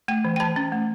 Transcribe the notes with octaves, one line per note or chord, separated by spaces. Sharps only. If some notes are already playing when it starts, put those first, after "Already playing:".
A3 G5
E3
G5
E3 A5
C#4
A3